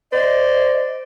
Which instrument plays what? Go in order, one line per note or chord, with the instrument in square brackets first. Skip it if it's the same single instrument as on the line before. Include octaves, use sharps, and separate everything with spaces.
[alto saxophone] C5 [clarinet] D5 [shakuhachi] D#5